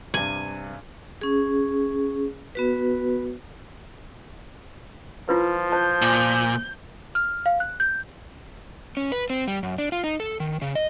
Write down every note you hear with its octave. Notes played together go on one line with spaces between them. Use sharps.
G2 C3 G#5
C#4 G#4
B3 F#4 B4
F3 E4 F4 B4
C5 A5 G6
A#2
F6
F5
F#6
G6
C#4
B4
C4
G3
F#2
D4
F4
D#4
A4
D#3
C#3
D#5